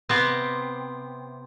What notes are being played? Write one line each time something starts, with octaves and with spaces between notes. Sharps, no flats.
C3 B3 C4